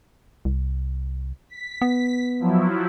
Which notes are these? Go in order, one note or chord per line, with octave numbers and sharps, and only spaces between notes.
C2
B6
B3
F3 F#3 E4